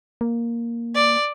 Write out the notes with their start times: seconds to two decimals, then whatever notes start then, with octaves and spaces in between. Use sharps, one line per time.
0.21 A#3
0.95 D5